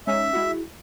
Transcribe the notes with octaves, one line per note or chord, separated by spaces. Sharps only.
G#3 C#4 D#4 E5
G#3 E4 F#4